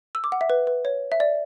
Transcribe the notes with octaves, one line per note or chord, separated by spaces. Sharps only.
E6
D6
F#5
E5
B4
B4
C#5
E5
D5